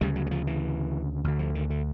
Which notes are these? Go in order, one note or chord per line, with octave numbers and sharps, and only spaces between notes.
D2 C#3 G3
F#3
F#3
F3
E3
D2 D3
F3
D#3
D3